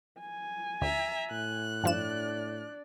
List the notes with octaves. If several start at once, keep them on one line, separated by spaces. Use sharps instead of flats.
G#5
D2 E5 A#5
A2 F#6
G2 F3 D4 D5 E7